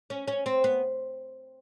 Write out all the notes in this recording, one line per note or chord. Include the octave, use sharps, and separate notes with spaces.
C#4
C#4
C4
B3